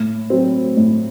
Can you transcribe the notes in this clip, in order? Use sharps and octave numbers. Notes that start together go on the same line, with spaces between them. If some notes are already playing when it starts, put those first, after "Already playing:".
Already playing: A2
F#3 C4
A2